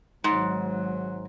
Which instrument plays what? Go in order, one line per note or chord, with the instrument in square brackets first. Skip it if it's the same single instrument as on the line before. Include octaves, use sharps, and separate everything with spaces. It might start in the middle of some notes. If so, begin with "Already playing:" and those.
[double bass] G#1 F#3 [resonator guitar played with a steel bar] G#2